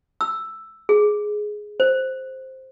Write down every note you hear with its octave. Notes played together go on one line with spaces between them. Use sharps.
E6
G#4
C5